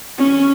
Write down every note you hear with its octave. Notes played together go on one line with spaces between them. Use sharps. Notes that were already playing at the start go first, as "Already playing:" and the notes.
C#4